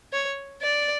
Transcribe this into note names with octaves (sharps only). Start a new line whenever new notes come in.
C#5
D5